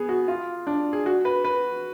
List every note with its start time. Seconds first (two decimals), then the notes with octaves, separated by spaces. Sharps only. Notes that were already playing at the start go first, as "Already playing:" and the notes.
Already playing: B3 G#4
0.09 F#4
0.28 F4
0.67 D4
0.93 G#4
1.06 F#4
1.25 B4
1.45 B4